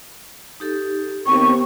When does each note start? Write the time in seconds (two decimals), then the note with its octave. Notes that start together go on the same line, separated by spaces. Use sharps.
0.60 D#4 G4 A4
1.27 D#2 B3 C4 G4 G5 C#6